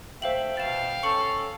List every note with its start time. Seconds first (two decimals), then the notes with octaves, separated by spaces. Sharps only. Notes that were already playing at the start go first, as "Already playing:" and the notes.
0.22 A3 C5 E5 F5 G5 F#7
0.57 B2 F5 A6 E7
1.03 C#4 A4 C#6 C#7 F#7